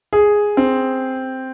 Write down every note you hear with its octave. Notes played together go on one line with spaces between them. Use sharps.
G#4
C4